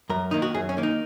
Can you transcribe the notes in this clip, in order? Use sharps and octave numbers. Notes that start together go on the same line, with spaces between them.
F#2 A#4
D#3 A#3 D#4
F#4
F#2 G#4
C#4
D#3 A#3
D#4